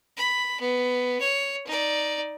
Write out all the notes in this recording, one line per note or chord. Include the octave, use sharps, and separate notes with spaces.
B5
B3
C#5
D#4 D5